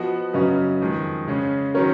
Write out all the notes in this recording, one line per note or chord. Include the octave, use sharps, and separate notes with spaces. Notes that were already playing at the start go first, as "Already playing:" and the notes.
Already playing: F3 B3 F#4 B4 D#5
F#2 C#3 F#3 C#4 B4 D#5
F2 D#3 G#3
C#3 G#3 C#4
D#3 F#3 C#4 A#4 C#5